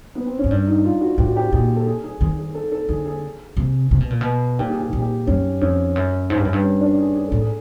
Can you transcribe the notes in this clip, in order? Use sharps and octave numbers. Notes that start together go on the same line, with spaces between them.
B3
C4
C#4
G#2
G2 D4
D#4
F4
F#4
A2 G4
F#4
G4
A#2 G#4
A4
G#4
G#4
D#3 G#4
G#4
A4
A4
D3 G#4
G#4
C3
C3
B2
A#2
B2
A#2 G4
G#4
G4
A#2 G#4
G4
F#2 C#4
F2 C#4
F#2
G#2
G2
F#2
G2
C#4
D4
G#4
G#4
A2 A4
G#4